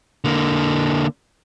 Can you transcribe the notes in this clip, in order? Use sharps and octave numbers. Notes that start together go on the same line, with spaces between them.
D3 A#3